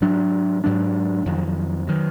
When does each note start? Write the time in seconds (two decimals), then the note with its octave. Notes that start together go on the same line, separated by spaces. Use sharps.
0.01 G#2 F#3 D4
0.64 G#2 F#3 D4
1.26 F2 D#3 F#3
1.87 D#3 F#3